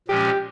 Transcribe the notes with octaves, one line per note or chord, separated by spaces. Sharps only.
A#2 F3 G#3 C#4 G4